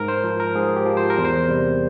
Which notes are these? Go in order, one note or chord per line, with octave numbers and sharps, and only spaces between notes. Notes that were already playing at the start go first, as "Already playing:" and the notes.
Already playing: G#2 A#4
C5
F3
A#4
G#2 G#4
G4
F3
C5
A#4
E2
C5
C3 G3